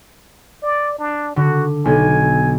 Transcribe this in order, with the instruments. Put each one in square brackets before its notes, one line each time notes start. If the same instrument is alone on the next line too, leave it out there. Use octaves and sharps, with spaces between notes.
[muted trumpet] D5
D4
[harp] D3 [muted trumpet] F#4
[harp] B1 [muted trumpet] G#5